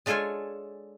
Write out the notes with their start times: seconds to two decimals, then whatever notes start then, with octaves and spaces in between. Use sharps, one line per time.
0.06 G#3 D4 F4 A4 C#5 G#5